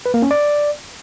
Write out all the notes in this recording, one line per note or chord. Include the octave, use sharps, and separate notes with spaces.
B4
A#3
C#4
D5